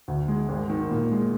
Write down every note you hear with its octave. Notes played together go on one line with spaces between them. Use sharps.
D2
G#3
G#1
D#3
A#2
G#3